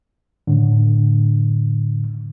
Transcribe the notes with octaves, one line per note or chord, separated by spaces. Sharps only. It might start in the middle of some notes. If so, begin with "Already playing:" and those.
A2 D3